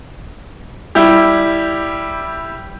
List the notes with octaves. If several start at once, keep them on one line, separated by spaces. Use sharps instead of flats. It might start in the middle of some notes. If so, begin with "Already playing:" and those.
G3 E4 G4